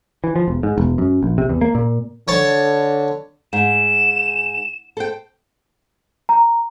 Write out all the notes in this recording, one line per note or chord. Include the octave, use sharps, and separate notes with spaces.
E3
F3
E1
G#2
E1
F#2
A#1
C3
E2
A#3
A#2
D3 C#5 A5
G#2 E7
A4 C5 G5
A#5